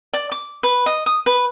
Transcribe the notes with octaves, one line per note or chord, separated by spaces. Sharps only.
D5
D6
B4
D#5
D#6
B4